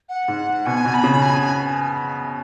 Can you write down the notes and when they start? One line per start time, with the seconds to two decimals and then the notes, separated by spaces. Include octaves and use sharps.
0.09 F#5
0.28 G#2
0.66 B2 G#5
0.85 B2
0.94 B5
1.04 C#3
1.23 G#5